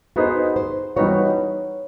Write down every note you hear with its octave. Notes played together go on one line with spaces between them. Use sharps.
B3 D#4 F#4 G#4 C5
C5
E3 G3 B3 D#4 F#4 C#5